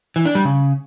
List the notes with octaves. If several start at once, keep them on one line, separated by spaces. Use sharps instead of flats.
E3
D4
G3
C#3